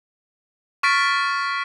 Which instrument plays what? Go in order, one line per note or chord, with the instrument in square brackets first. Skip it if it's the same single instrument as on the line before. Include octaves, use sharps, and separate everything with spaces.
[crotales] C#6 F6 A6 B6 D7